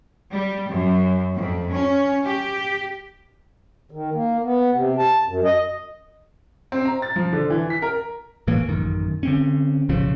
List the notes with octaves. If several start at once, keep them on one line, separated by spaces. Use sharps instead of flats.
G3
F#2
F2
C#4
G4
D#3
A#3
B3
C3
A5
F#2
D#5
C4
A#5
A6
F3
D3
E3
B6
A#4
A2 E3 A#3
A1 F#2 D#3
D3 C4 C#4
B1 A2 C#3 F3